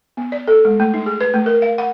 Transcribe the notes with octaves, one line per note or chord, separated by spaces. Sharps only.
B3
D5
A4
G#3
A3
D#4
G#4
B4
A3
A#4
F5
F#5